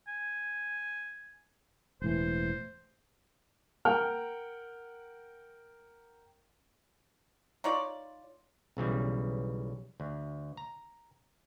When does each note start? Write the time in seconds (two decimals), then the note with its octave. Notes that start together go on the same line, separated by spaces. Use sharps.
0.08 G#5
2.02 E1 A2 E3 C5
3.85 A#4 F#5 G5 F6
7.64 D#4 F4 C#5 D5
8.77 B1 C#3 E3 G3
10.00 D2
10.57 A#5